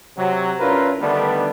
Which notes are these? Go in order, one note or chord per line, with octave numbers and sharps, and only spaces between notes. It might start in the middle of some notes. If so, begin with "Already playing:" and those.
C3 F#3
C#4 D4 E4 F4 A#4 B4
D3 D#3 G3 A3 B3 D4